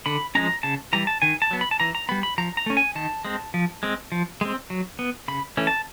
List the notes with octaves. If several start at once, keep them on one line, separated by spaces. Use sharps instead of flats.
D3 B5
F3 G#3 C#4 A#5
C#3 A5
E3 G3 A#5
A5
D#3 G#5
A5
F#3 B3
B5
A5
E3 A#5
A#5
G3 B3 B5
B5
F3 A#5
A#5
A3 C#4
G#5
D#3 A5
G#3 C4
F3
G#3 C4
F3
G#3 C4
F#3
B3
C#3 B5
E3 A3 C#4
A5